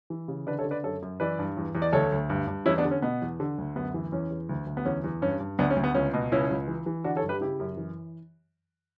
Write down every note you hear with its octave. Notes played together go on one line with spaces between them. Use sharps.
E3
C#3
D3 B4 D5
A4 C#5
D3
B4 D5
F#2 A4 C#5
F#2
E3 B4 D5
G2
E2
E2
D5
D2 A4 C#5
D2
G2
G2
E2 C#4 E4
B3 D4
D3
C#4
B2 B3
E2
D3
D2
F#2 B3
E3
E2 C#4
E2
D2
D2
B3
E2 C#4
E2
G2 C#4
G2
D2 B3 D4
C#4
D2
B3
C#2 C#4
B2
C#2 C#4 E4
C#2
E3
E3
D3 D4 F#4
A4 C#5
G2
G4 B4
C#3 E4 G4
F#2
E3